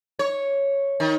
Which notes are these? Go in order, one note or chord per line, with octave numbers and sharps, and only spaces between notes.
C#5
D#3